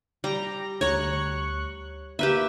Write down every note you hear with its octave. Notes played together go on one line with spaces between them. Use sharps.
G3 G5 A#5
D2 C#5 A#5 C#6 F#6
A#3 G4 B4 E5